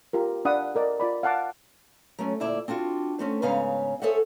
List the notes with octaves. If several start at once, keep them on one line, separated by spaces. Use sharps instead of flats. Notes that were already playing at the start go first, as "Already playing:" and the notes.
F4 G4 A#4
D4 D5 F5 F#5 B5 D#6
A4 A#4 D5 D#5
F4 D5 B5
F5 F#5 A5 D6
F#3 A3 C#4
D2 A#2 E4 D5 E5
C4 D4 F4 F#4
A3 C4 C#4
G#2 C#3 B3 C#5 F5 A#5
G#4 A4 C5 C#5 E5 F#5